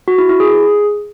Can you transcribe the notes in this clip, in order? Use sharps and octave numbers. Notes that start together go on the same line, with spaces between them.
F#4
E4
E4
G#4